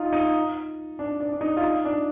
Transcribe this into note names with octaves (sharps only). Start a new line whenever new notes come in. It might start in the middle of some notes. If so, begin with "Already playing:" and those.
Already playing: D#4 F4
D#4
D4
D4
D4
D#4
F4
D#4
D4